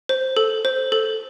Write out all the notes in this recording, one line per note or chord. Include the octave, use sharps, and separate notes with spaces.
C5
A4
C5
A4